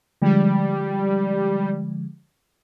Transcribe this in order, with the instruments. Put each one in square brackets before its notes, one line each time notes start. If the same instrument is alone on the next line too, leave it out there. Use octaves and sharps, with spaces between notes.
[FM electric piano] D3 F3 G#3 [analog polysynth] G3